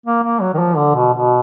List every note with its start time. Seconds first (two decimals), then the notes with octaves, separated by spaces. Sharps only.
0.06 A#3
0.24 A#3
0.41 F#3
0.54 D#3
0.59 F3
0.77 D3
0.96 B2
1.13 B2